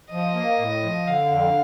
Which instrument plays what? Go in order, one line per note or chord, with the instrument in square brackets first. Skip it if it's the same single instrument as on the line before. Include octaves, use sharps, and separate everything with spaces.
[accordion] F3 [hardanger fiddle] D#5
[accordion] A#3
A2
F3
[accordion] D3 [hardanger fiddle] F5
[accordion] F2